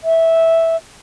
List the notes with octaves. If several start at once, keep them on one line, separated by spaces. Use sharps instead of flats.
E5